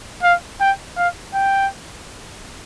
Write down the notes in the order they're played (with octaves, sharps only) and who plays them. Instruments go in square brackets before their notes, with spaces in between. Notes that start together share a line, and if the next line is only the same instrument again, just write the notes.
[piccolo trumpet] F5
G5
F5
G5